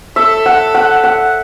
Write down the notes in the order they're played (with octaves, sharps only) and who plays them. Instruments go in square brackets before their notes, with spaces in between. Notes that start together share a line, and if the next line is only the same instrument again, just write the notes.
[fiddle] A4 [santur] E5
[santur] F#5
F#5
F#5